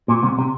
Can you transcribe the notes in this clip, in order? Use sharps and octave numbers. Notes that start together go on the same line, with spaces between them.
A#2
C2 C3
C3